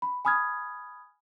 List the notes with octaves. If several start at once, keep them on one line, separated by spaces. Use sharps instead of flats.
B5
G#5 B5 D#6 F6 G#6